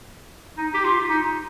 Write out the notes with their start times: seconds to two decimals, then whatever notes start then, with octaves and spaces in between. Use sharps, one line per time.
0.57 D#4
0.74 G4
0.84 F4
1.10 D#4